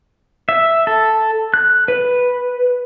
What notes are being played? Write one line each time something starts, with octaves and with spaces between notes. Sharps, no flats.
E5
A4
F#6
B4